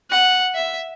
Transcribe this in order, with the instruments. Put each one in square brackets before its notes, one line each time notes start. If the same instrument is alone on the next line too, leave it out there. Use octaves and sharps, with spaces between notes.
[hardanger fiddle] F#5
E5